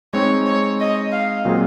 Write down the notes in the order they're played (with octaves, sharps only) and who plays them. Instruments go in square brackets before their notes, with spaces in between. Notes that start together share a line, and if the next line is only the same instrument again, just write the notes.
[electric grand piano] G#3 C4 D#4 [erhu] C#5
[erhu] C#5
D#5
F5
[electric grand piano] A#2 F#3 C4 F4 G#4